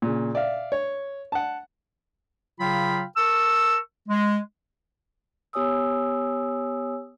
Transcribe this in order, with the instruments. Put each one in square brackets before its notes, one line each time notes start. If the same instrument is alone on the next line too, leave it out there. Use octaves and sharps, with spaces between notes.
[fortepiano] A#2 C#3
D5 E5 F5
C#5
F#5 A5
[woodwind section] C#3 F#3 F4 F5 G5 B5
A#4 A5 C#6 E6
G#3
[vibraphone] B3 G4 C#5 G#5 D#6 E6